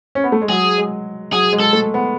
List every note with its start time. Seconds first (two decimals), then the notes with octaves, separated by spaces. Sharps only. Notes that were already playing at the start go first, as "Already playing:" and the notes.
0.15 C#4
0.24 B3
0.32 A3
0.42 G#3
0.49 F#3 G#4
0.78 G#3
1.32 F#3 G#4
1.53 G#3
1.60 A4
1.73 A3
1.94 B3